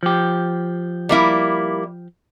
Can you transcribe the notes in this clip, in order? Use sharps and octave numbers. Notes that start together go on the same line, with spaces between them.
F3 G4
G3 A#3 E4